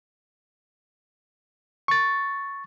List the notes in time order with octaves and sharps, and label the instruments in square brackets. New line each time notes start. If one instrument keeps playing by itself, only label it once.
[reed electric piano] C#6 A6